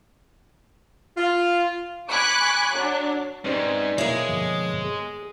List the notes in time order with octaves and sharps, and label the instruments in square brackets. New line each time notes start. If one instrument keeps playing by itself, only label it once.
[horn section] F4
[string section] G#5 B5 C#6 D6 F#6
F#3 D4
[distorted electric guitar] G#2 G#3 [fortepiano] C4 C#4 [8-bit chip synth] B4 D5
[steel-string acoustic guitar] B2 C#5 [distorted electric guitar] G#3 [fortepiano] A#3 E4
[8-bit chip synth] G2 D3 F3
G#4